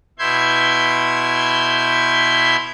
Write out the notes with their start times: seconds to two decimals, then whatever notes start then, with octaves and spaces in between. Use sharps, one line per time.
0.19 B2 E4 E5 C6 G6 G#6